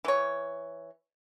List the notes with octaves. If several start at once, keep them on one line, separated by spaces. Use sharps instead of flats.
E3 C#5